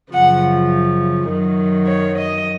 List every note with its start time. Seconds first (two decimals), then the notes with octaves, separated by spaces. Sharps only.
0.14 F#2 C#3 F3 F#5
1.29 F#2 D#3 F#3
1.87 C#5
2.16 D#5